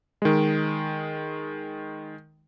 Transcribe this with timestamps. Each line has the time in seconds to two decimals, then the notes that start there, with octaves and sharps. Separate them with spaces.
0.22 D#3 G#3